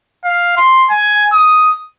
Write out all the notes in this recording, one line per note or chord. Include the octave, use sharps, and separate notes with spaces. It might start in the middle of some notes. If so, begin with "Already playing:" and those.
F5
C6
G#5
D#6